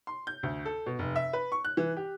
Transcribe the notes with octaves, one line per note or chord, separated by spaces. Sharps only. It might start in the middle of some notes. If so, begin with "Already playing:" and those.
C6
G6
D2
A4
B2
F1
E5
B4
C#6
F#6
E3
G4